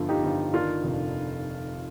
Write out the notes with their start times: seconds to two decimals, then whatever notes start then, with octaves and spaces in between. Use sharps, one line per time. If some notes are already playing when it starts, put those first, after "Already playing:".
Already playing: G1 F3 F4 A4
0.09 D#4 G4
0.23 G1
0.53 D#3 D4 F4
0.84 F1